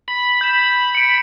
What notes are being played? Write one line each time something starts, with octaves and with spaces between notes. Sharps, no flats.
B5
G6 E7
C#7 D7